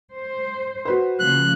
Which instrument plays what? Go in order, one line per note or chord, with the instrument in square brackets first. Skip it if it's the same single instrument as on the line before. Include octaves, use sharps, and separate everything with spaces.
[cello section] C5
[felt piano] F#4 B4 C5
[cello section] C#3 F3 A#3 [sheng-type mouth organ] F#6